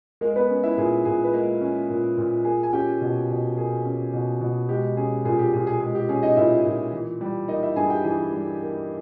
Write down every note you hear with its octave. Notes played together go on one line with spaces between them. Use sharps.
G#3 A#3 A#4
B3 B4
C#4
E4 E5
A#2 G#4
A#2 G#4
B4
G#3 A#3 A#4
C#4
A#2
A#2
A#3 G#4 G#5
G#5
C#4 G4 G5
B2
B2
A#3 G#4
C#4
B2
B2
G#3 G4
C#4 G#4
A#2 G#4
G4
A#2 G#4
G#4
G#3 G#4
G4
C#4 G#4
D#4 D#5
A#2 E4 E5
A#2
E3
G3
A#3 D#4 D#5
E4 E5
G2 G#4 G#5
G4 G5
E3 G#4 G#5
G3
A#3